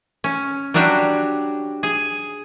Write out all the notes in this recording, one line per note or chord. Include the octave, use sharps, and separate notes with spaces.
C#4
F#3 G3 D4 F#4 G4
G#4